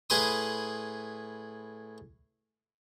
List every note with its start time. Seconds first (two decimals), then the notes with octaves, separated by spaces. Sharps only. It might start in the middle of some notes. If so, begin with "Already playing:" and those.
0.10 A2 G#4 B4 B5 C6 D#6